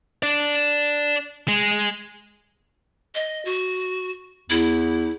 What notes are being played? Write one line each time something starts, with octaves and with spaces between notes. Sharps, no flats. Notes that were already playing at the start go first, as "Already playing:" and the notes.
D4 D5
G#3
D#5
F#4
E2 E4